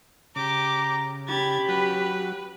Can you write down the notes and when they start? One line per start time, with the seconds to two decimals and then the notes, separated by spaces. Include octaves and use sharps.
0.36 C#3 G4 A#5 D6
1.29 C#4 G4 B5 G#6 A6
1.68 F#3 F#4 B4